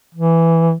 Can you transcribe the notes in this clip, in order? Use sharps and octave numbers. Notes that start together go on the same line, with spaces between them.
E3